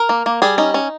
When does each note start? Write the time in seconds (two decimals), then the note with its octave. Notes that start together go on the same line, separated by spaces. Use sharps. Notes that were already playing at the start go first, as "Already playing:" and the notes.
Already playing: A#4
0.09 A#3
0.26 A#3
0.42 G3 G#4
0.58 C#4 D#4
0.74 C#4